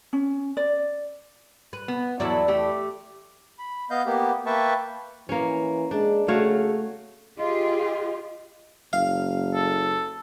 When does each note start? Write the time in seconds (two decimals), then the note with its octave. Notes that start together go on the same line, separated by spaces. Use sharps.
0.13 C#4
0.57 D5
1.73 B4
1.88 B3
2.20 E2 F#3 E4 A4 D5
2.48 A3 G4
3.59 B5
3.90 B3 D#5 F5 G6
4.06 A#3 B3 G4
4.46 A#3 B4 E5 G5 A5 C#6
5.29 E3 A#3 C#4
5.91 G#3 D4
6.28 C#3 A3 F#4 C#5 F5
7.39 F4 G4 G#4 D#5
8.93 F#1 F5
9.55 A4